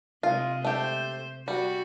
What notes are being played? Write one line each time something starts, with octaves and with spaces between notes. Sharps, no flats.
C3 G#3 F4
A3 G4 C5
G3 F#4